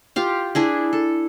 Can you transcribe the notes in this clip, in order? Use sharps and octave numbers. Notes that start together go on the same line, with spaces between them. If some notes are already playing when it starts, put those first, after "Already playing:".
F4 G4 F5
D4 E4 G#4
A4